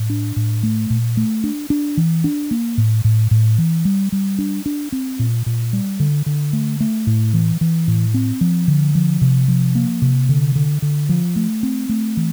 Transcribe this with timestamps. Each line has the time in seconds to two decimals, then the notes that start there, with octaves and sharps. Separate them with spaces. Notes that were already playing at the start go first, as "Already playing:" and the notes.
Already playing: A2
0.10 D4
0.36 A2
0.63 A3
0.90 A#2
1.17 A3
1.44 D4
1.70 D4
1.97 E3
2.24 D4
2.51 A#3
2.78 A2
3.05 A2
3.31 A2
3.58 E3
3.85 G3
4.12 G3
4.39 D4
4.66 D4
4.92 C4
5.19 A#2
5.46 A#2
5.73 G3
6.00 D3
6.26 D3
6.53 A3
6.80 A3
7.07 A2
7.34 E3
7.61 E3
7.88 A2
8.14 C4
8.41 F3
8.68 D3
8.95 F3
9.22 C3
9.48 F3
9.75 A#3
10.02 C3
10.29 D3
10.56 D3
10.82 D3
11.09 F3
11.36 A3
11.63 C4
11.89 A3
12.17 E3